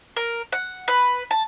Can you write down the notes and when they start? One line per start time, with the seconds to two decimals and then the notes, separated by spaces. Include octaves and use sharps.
0.17 A#4
0.52 F#5
0.88 B4
1.31 A5